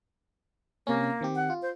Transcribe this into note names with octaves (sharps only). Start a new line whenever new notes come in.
C3 A#3 C#4
D#3 C4 G4
F#5
F4
C5